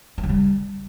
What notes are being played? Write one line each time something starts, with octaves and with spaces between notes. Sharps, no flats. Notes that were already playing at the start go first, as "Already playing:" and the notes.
A3
D3
G3